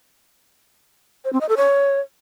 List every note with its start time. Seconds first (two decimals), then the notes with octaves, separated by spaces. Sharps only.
1.25 C5
1.33 C4
1.41 D#5
1.49 A4
1.57 C#5